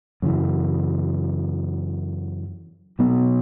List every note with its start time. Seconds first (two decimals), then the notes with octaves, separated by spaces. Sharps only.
0.22 F#2 C#3 E3
2.99 B2 F#3 B3